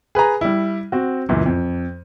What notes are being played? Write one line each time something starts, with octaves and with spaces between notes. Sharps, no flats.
G#4 B4 G#5 A#5
G3 E4
C4 F#4
C#2 F#2 A#2 E3
F2